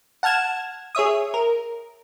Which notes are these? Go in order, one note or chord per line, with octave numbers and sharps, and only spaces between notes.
F#5 A5 F6 G#6 E7
G#4 C#5 E5 D#6
A#4